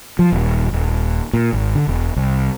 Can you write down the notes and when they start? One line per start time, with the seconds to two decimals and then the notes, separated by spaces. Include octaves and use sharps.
0.19 F3
0.32 D#1
0.73 D#1
1.33 A#2
1.53 G#1
1.75 D3
1.87 E1
2.16 C2